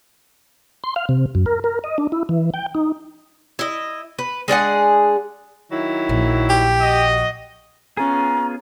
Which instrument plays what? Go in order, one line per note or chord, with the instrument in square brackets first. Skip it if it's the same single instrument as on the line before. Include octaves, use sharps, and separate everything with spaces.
[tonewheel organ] C6
F5
C3
F#2
A#4
A#4
D#5
D4
E4
E3
G5
D#4
[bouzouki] E4 D#5
B4
G#3 D4 G#4 F#5
[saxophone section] D#3 F#3 E4
[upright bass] A#1
[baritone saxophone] G4
[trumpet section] F#4 D#5
[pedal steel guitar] B3 F4 G#4 [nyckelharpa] C#4 [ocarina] A#5